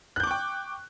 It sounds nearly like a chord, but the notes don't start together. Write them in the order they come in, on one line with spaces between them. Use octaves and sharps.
F#6 G6 D6 C#6 G5